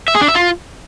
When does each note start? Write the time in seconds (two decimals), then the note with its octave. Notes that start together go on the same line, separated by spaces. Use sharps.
0.08 E5
0.15 G#4
0.22 D4
0.28 E5
0.35 F4